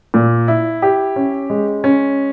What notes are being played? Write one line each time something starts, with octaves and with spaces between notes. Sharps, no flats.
A#2
E4
G4
C#4
G#3
C#4